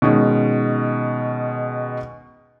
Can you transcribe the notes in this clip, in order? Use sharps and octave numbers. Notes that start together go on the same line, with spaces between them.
B2 D#3 G#3 C#4